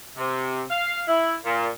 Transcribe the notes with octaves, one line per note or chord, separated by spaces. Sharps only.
C3
F5
E4
A#2